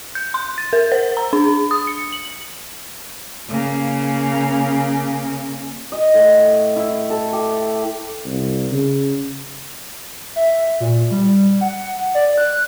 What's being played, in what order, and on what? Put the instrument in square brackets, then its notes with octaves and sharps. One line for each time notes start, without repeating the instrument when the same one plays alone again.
[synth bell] G6
C6
A6
A#4
C5
A#5
D4
D#6
C#7
F#7
[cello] C#3 A#3
[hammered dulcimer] D#5
A2
E4
A4
G4
[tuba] C2
C#3
[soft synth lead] E5
A#2
G3
F#5
D5
F#6